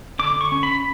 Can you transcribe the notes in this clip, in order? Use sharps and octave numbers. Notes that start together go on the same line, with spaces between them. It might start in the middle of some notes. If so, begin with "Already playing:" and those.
D3 D6
C#6
C#4
B5